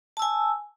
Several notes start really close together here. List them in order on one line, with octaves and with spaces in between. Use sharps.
A5 E6 G#5